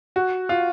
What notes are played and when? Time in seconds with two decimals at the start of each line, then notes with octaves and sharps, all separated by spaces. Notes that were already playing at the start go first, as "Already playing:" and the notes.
0.16 F#4
0.49 F4